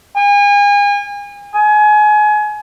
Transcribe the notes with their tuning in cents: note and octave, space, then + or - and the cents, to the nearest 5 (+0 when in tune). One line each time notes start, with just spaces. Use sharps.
G#5 -35
G#5 +30